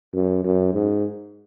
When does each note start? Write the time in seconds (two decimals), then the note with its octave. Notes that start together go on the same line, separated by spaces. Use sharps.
0.14 F#2
0.44 F#2
0.73 G#2